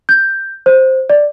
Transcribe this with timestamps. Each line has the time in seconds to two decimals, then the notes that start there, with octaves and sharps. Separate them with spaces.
0.09 G6
0.66 C5
1.10 D5